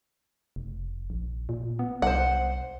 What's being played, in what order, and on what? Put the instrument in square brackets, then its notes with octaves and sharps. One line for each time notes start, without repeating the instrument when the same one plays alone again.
[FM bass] F1
A#1
A#2
B3
[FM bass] C2 [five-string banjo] C5 F#5